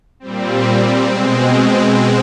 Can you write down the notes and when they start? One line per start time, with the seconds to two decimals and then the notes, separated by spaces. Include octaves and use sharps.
0.20 A#2 G3 C4
1.08 B2 G#3 C4